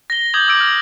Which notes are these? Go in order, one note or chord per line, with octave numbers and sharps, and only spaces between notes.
A#6 G7
D6 D#6 G6 G#6 F#7
D6 E6 D7
F6